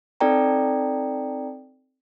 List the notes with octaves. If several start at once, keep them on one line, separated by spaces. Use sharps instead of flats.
C4 D#4 A4 D5 G5 A#5